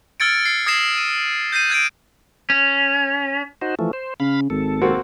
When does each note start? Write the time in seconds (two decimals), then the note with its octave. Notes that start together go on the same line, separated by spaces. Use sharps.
0.20 E6 F6 G#6 A6 C#7 D7
0.45 C7
0.66 D#6 G#6 A#6 C7 E7
0.97 D#7
1.52 G6 A#6 C7 D#7
1.70 F#6 G#6 A#6 D7
2.50 C#4
3.61 D#4 F#4 C5
3.79 E3 F3 A3
3.93 C5
4.20 C#3 F5 B5
4.50 G#1 A4
4.81 A#3 C4 F#4